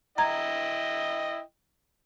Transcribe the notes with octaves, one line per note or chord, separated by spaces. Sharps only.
E4 D#5 G5 A#5 G#6